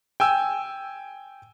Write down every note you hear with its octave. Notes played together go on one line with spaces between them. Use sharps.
G5 G#5 E6